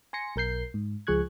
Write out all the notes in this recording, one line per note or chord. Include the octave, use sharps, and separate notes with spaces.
G#5 C6 A#6 C#7
B1 A#4 G6 C7
G#2
C#2 F3 G#4 C#6 F#6 G#6